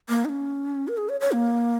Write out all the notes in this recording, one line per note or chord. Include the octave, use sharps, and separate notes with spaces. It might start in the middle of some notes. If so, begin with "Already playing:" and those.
A#3
D#4
C#4
A#4
G#4
C#5
C#5
A#3